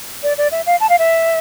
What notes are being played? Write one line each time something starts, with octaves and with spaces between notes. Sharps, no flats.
D5
D5
E5
F5
A5
F5
E5